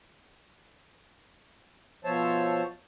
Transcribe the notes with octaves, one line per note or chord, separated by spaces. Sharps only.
B2 F3 C5 C#5 E5 A5